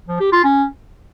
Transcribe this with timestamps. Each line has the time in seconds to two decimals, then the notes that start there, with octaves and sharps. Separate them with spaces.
0.08 F3
0.20 G4
0.32 F4
0.44 C#4